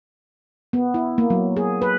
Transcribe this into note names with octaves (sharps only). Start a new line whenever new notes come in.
B3
E4
A#3
F#3
G#4
B4